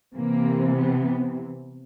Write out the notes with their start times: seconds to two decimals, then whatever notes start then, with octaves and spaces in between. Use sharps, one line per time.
0.16 C3 E3 A#3
0.77 B3